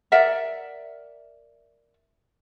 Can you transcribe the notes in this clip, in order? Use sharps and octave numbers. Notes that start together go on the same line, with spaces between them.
A#4 D5 E5 F#5